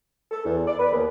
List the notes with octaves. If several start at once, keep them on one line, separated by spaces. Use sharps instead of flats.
A4
E2
D5
B4
D#2